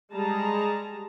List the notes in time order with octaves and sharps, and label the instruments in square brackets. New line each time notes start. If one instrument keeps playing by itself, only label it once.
[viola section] G3 G#3 G#4 A5 A#5